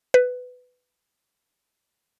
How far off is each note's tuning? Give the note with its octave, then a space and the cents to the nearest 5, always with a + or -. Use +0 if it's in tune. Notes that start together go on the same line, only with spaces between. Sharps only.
B4 +15